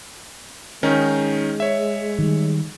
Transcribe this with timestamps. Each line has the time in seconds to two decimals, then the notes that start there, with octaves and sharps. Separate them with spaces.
0.83 D#3 G#3 C#4 D#4
1.60 C#5 E5
2.19 D#3 G3